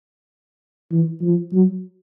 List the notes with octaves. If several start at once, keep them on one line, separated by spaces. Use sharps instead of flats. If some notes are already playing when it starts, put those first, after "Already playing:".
E3
F3
F#3